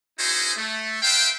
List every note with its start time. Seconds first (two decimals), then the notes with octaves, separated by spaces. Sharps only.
0.19 C#4 D#4 E4 F#4 G#4 C5
0.57 A3
1.02 B4 C5 E5 F5 G5